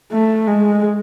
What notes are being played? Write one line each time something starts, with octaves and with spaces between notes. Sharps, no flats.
A3
G#3